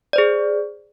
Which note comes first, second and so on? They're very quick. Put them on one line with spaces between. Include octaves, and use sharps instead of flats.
D5 C5 G#4